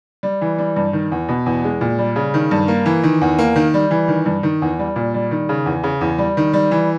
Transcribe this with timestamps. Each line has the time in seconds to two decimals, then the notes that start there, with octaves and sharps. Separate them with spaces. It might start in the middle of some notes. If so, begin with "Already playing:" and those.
0.23 G3
0.41 E3
0.58 G3
0.76 G2
0.93 D#3
1.12 E2
1.28 B2
1.46 E2
1.64 G#3
1.81 A#2
1.98 G3
2.16 C#3
2.34 D#3
2.51 G2
2.68 A#3
2.86 E3
3.03 D#3
3.21 E2
3.39 A#3
3.56 D#3
3.74 G3
3.91 E3
4.08 D#3
4.26 G2
4.43 D#3
4.62 E2
4.79 G3
4.96 A#2
5.14 G3
5.31 D#3
5.49 C#3
5.66 E2
5.83 C#3
6.01 E2
6.18 G3
6.37 D#3
6.54 G3
6.71 E3